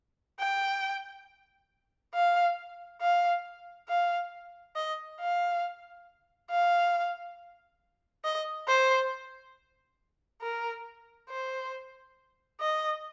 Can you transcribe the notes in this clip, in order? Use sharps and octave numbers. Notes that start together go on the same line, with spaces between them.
G5
F5
F5
F5
D#5
F5
F5
D#5
C5
A#4
C5
D#5